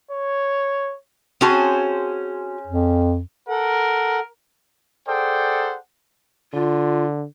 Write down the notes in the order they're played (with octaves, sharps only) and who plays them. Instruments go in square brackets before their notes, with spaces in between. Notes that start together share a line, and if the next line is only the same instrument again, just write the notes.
[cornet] C#5
[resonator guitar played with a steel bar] C4 F#4 A5 [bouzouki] C#4 G#4 C5
[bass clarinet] F2
[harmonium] A4 F#5 [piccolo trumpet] A#4
[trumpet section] G#4 A4 C5 D5 F#5 G5
[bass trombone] D3 [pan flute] F4